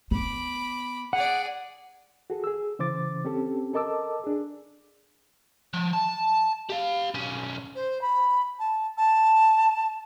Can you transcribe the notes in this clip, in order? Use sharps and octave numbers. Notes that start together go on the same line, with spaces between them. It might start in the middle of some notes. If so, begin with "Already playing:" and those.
B3 B5 D6
G#4 D5 F#5
F#4 G#4 A4
G#4 E6
C#3 E3 C5 D6 A6
C4 C#4 G4 A4
A4 A#4 D#5 A5 D6 E6
D4 G#4
F3
A5
G4 F5
B1 C#4
C5
B5
A5
A5